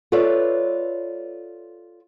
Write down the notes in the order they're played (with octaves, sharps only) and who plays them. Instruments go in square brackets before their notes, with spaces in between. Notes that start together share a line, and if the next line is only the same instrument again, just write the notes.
[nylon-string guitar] F4 A4 B4 C#5 D5 E5